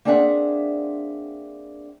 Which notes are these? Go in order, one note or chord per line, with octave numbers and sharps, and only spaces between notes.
A#3 C4 D4 G#4 E5 F#5